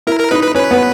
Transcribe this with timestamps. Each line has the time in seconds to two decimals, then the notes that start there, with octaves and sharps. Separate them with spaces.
0.07 E4 A#4
0.20 A#4
0.31 D#4 B4
0.43 B4
0.55 C#4 B4
0.71 B3